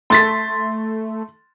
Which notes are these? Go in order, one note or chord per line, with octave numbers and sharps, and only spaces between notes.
A3 C6 A6 B6